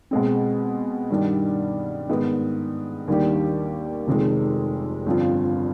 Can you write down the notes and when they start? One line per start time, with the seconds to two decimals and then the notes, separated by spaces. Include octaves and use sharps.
0.11 B2 G#3 C4
1.10 G2 D#3 G3 D4
2.09 G#2 D#3 B3 D#4
3.08 D#2 D#3 G3 D4 G4
4.07 F1 F2 C3 D#3 G#3
5.06 G1 G2 F3 C4 F4